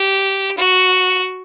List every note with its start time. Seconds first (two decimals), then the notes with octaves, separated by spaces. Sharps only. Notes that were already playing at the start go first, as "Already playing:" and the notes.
Already playing: G4
0.58 F#4